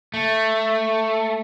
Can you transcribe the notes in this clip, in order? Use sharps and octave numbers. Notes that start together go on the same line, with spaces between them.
A3